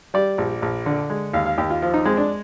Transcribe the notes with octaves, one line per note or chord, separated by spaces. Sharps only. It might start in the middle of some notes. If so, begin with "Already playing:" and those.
G3 D5
A#1
A#1
D3
G#3
D#2 F5
F5
D#2 G4
F4
F3 F4
D#4
G#3 C4
D4